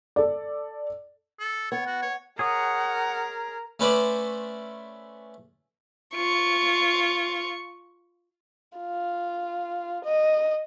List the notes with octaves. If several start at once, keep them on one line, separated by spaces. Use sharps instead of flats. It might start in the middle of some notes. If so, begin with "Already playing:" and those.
A4 D5
A4
B3 C#5
F#4
C#5
G#4 A#4 C#5 F#5 D#6
A3 C#4 B4 C5 D5
F4 C#6
F4
D#5